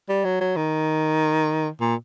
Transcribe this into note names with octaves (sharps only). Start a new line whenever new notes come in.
G3
F#3
F#3
D#3
A#2